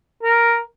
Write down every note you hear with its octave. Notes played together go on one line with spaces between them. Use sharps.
A#4